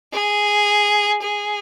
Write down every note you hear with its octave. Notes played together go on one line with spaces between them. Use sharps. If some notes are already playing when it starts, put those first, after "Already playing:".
G#4
G#4